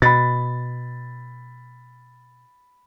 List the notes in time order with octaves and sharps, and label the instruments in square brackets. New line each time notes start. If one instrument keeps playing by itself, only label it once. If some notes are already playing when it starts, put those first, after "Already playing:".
[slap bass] B2 [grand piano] B5 A6